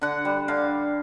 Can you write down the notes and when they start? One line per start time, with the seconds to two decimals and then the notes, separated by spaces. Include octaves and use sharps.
0.01 D3 F#5
0.25 G3
0.48 D3 F5